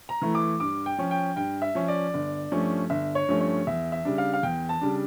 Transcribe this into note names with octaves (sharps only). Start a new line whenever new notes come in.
A#5
E3 A3 E4
D6
G2 D6
G5
F3 C#4
G5
G2 G5
E5
F3 C#4
D5
G1
G2 F3 A3 C#4
G1 E5
C#5
G2 F3 A3 C#4
C#5
E2 E5
E5
C#3 G3 D4
F5
F5
E2 G5
A5
C#3 G3 D4